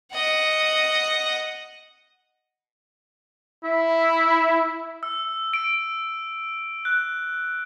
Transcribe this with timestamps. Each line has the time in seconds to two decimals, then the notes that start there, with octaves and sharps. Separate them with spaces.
0.13 D#5 F#5
3.64 E4 E5
5.03 E6
5.54 D7
6.85 F#6